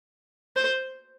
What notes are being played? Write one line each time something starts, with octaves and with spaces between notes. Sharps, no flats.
C5